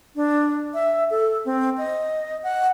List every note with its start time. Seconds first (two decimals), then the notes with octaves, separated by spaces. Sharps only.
0.16 D4
0.74 E5
1.10 A4
1.45 C4
1.78 D#5
2.43 F#5